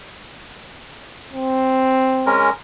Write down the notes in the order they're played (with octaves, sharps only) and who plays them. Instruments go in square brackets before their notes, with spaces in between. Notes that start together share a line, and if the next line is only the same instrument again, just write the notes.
[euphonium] C4
[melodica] G#3 C#4 A#4